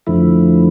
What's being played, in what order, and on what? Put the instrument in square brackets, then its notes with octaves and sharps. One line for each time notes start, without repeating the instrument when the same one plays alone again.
[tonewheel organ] F2 D3 F3 A3 E4